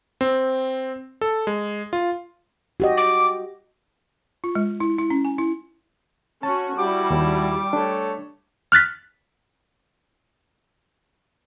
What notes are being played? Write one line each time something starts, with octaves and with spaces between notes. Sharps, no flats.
C4
A4
G#3
F4
F#4 G4 D#5
D6
F4
G#3
E4
E4
C#4
G#5
E4
C#4 F#4 A5
G3 D4 E4 F#4 G5 D6
D#2
A3 D4 C#5
F6 F#6 A6 B6